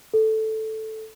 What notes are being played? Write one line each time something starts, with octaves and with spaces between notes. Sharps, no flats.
A4